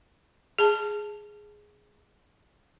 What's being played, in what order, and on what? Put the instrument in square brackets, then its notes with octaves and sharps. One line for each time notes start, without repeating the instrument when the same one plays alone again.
[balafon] G#4 A5